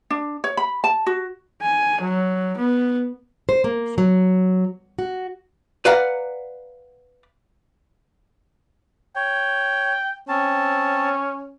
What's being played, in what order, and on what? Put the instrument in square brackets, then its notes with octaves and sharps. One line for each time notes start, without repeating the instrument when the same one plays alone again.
[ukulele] D4
C#5
B5
A5
F#4
[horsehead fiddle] G#5
F#3
B3
[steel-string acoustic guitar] C5
A#3
F#3
F#4
[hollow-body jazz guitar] B4 D5 F5 F#5 A#5
[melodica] C#5 [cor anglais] G5
[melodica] C4 A5 [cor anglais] C#4